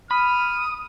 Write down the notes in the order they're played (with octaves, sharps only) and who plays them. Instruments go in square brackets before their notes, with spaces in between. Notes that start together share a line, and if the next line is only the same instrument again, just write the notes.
[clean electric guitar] B5 [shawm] D#6 [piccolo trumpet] F6